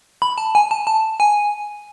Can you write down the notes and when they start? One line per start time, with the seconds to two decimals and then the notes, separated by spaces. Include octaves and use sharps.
0.22 B5
0.38 A5
0.55 G#5
0.71 A5
0.87 A5
1.20 G#5